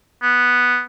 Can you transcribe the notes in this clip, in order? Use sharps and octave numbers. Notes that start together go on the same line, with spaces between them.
B3